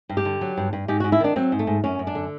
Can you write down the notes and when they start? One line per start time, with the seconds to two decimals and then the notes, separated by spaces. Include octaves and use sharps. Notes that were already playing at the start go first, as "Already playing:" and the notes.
0.09 G2
0.17 G4
0.25 D3
0.41 F#3
0.57 G2
0.73 G2
0.88 G#2 G4
1.00 F#4
1.04 G#2
1.12 E4
1.20 D#3 D4
1.36 F#3 C4
1.52 G#2
1.59 A3
1.67 G#2
1.84 F#2 C#4
1.99 F#2
2.07 D4
2.15 D3